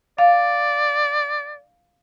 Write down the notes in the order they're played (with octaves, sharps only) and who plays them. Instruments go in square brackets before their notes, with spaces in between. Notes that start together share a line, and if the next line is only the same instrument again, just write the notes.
[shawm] D5 [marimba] F5